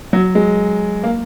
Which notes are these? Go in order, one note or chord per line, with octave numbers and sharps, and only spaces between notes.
F#3
G#3
A#3